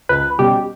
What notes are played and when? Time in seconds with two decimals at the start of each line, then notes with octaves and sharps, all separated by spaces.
0.09 C#2 B4
0.38 B2 G3 C#4 G4